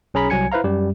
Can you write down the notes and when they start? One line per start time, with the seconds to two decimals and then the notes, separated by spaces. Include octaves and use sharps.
0.14 B1 C#4 G#4 A#5 B5 B6
0.30 C2 F#3 G#5 G#6 C#7
0.52 E4 B4 C5 F5 A#5
0.64 F#2 G3 G4